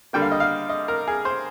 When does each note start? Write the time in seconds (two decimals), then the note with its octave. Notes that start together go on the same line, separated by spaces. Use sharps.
0.13 D3 G3 A#3 G5
0.22 F5
0.32 D#5
0.40 F5
0.69 D#5
0.88 A#4
1.08 G#4
1.25 C5